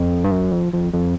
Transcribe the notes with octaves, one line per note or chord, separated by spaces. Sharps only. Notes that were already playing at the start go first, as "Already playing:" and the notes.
Already playing: F2
G2
F#2
F2
F2
F2